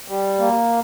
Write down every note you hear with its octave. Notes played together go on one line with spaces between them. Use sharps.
G3
A#3